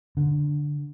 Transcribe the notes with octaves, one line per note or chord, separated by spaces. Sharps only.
D3